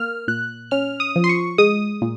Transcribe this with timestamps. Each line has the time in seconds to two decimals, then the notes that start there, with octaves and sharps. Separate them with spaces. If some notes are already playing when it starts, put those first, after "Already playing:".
Already playing: A#3 F6
0.28 A#2 F#6
0.71 C#4 F6
1.00 D#6
1.16 F3
1.24 C6
1.29 C#6
1.58 G#3 D#6
2.02 A#2